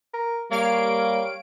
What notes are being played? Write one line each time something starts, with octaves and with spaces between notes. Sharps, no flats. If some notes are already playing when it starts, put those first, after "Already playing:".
A#4
G3 A#3 C#5 F5 D7